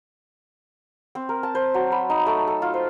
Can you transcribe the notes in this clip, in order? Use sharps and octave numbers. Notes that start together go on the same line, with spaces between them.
C4
A#4
A5
C5
F#3
B5
D#4
A3
A4
F4
C5